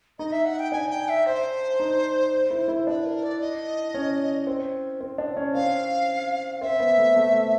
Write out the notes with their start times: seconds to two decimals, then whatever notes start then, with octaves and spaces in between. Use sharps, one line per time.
0.19 D#4 D#5
0.32 E5
0.45 F#5
0.59 G5
0.72 D4 G#5
0.90 G5
1.09 E5
1.26 C5
1.80 D#4
2.51 E4
2.68 E4
2.87 D4 B4
3.05 A#4
3.23 D5
3.41 D#5
3.94 C#4
4.47 C4
5.01 C4
5.18 D4
5.37 C#4
5.54 C4 F5
6.61 C4 E5
6.80 B3
6.98 A3
7.16 A3